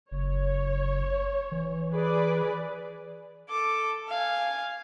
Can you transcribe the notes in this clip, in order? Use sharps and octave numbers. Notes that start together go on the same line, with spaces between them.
F#1 C#5
E3
G#4 B4 D5
A4 D6
F5 G#5